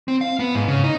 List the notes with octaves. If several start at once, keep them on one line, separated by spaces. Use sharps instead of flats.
C4
F5
B3
G#2
C#3
D#4